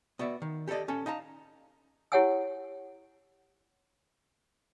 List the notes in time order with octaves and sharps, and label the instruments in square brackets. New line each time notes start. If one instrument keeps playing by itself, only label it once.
[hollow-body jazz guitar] B3 F#4 D5 E5
D#3
G4 A4 A#4 D5 D#5
C#4 A4
D#4 F5 A5 A#5
[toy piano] E4 G4 C#5 F#5 G#5 E6